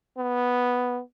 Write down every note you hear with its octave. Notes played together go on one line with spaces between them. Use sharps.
B3